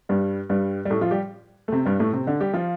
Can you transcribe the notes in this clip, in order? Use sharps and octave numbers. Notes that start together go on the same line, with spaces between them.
G2 G3
G2 G3
G3
A2 A3
F3 F4
G3 G4
A3
C3 C4
G2 G3
A2 A3
C3 C4
D3 D4
G3 G4
F3 F4